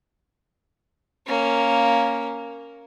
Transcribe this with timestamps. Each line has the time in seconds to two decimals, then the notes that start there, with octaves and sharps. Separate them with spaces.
1.26 A#3 C#4